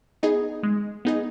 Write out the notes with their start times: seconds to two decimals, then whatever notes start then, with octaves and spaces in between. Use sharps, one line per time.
0.23 B3 D#4 G#4 D#5
0.63 G#3
1.05 B3 D#4 G#4 D#5